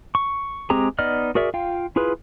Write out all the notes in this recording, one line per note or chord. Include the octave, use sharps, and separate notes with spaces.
C#6
G#3 C4 G4 G#4 A#5
B3 D#4 D5 D#5 F6
F#4 G#4 A#4 D5 E5
F4 F5 G5
E4 F4 G#4 B4